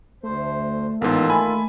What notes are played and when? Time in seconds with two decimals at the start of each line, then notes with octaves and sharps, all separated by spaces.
0.23 D2 A3 C5
1.02 A1 G#2 D#3 A#3 B3 F4 A4
1.30 A3 G#5 B5